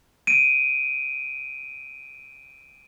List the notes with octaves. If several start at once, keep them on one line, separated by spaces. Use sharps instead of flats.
D7 D#7